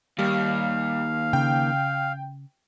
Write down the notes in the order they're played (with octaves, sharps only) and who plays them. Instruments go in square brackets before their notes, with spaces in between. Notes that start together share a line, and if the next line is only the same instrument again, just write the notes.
[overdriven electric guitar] D#2 [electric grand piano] G3 [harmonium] F5
[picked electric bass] C#3 [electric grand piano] G5